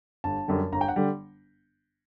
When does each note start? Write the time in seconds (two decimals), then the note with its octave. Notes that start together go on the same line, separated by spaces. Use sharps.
0.24 G1 A5
0.48 F#2 D3 G3
0.72 G1 A#5
0.81 G5
0.88 F#5
0.96 D3 G3